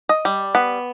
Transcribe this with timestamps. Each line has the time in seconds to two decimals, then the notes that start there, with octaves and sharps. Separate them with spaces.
0.09 D#5
0.25 G3
0.55 B3